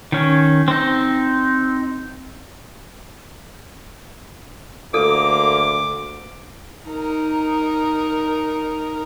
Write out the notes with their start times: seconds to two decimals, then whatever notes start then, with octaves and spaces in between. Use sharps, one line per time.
0.12 D#3 C#4
0.68 C4 D#4
4.94 D2 A#3 A4 D6
6.88 D#4 A#4